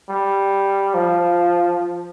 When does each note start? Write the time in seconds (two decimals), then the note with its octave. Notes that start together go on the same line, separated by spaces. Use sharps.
0.10 G3
0.94 F3